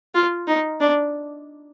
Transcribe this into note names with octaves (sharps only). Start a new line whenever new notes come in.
F4
D#4
D4